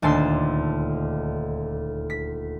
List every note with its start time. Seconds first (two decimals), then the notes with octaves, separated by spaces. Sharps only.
0.02 D#1 D2 A5 C6 E6
2.10 B6